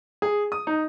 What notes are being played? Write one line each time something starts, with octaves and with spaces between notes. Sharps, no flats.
G#4
D#6
D#4